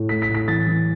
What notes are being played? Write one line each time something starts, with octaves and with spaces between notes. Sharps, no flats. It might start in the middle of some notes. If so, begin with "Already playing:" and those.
Already playing: A2
A3 B6
B6
A2
B6
E3 A6
E3